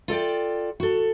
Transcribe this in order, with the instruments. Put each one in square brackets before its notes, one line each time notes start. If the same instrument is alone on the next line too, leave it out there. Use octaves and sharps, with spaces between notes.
[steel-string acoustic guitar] F4 A4 D5 G5
F#4 A4